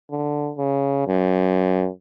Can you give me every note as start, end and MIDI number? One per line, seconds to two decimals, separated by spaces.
0.11 0.52 50
0.58 1.03 49
1.07 1.89 42